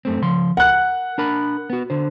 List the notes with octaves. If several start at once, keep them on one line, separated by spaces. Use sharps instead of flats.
F#2 A3 C4
C#3 F3 C6
A#4 F#5 F#6
D4 A#4 B5
B3 F#4
D3 C5